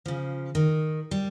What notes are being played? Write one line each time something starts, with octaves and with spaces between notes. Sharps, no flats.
C#3 F3
D#3
G3